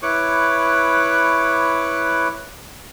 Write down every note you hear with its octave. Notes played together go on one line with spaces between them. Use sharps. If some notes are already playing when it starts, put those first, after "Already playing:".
E4 B4 C#5 C#6 D6 F#6